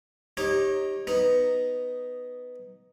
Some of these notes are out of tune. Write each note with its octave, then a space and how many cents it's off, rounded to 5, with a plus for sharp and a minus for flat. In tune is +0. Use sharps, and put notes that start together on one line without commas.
D#4 +0 G4 +0 C#5 -25
B3 +5 D#4 +0